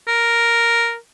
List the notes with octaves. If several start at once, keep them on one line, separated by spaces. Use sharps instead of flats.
A#4